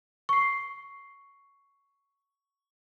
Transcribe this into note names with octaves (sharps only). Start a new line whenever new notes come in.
C#6 C7